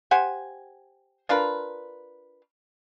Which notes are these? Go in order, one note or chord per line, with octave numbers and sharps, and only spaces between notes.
G4 C5 F#5 G#5
D4 F4 A#4 B4